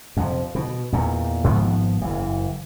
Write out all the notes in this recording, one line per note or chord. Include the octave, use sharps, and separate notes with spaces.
F2 C3
B2
E2 A#2 D#3
G#1 G#2 F3 B3
F#1 E3